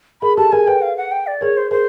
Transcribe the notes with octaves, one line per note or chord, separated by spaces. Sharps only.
G#4 A#4 B5
G4 A4 A5
G#4 A#4 G#5
A4 B4 G5
F5
F#5
G5
D5
G#4 A#4 C#5
C5
G#4 A#4 C5